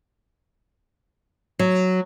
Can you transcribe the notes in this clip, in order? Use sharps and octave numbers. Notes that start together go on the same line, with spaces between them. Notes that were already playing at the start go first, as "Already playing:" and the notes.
F#3